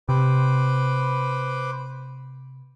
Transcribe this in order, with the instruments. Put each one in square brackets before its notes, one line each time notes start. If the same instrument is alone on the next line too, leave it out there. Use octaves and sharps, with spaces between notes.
[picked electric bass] C3 [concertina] B4 C5 D6